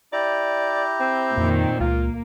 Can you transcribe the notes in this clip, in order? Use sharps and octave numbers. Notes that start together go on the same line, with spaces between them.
E4 G4 D5 A#5
C4
F2 A#2 D#3
C#2 A#3 F4